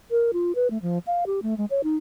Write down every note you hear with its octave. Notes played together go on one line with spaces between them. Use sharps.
A#4
F4
B4
A3
F3
F5
G4
A3
G#3
C#5
D#4